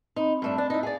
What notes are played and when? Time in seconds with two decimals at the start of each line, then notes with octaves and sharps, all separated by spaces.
0.16 C4 D#4 B5
0.42 G2 A3 D4
0.58 D4
0.70 D#4 E4
0.83 G#4 D5 F5